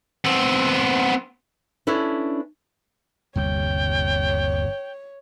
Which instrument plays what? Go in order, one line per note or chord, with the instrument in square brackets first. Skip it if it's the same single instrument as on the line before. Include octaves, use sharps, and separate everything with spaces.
[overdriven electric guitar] B3 C4
[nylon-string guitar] C#4 D4 E4 A4 B4
[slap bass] G1 C3 G3 [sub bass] D#2 [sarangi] C#5 [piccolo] G5